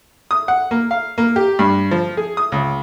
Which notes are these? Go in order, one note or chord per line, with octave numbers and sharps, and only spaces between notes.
D#6
F#5
A#3
F5
A#3
G4
G2
F3
G#4
D#6
C#2